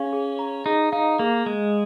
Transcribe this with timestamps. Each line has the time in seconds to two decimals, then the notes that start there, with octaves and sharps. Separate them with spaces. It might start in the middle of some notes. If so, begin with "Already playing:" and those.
Already playing: C#4 G#4 F5
0.13 G#4
0.39 A#5
0.66 D#4 G#4
0.92 D#4 F5
1.19 A#3 G#4
1.46 G#3 A#5